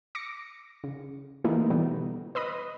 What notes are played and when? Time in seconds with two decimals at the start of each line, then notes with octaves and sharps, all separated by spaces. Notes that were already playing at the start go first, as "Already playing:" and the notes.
0.15 D6 A#6 C#7
0.84 C#3
1.44 E3 A3 A#3 D#4 E4
1.70 B2 D3 E3 G3 B3 D#4
2.35 B4 D#5 B5 D#6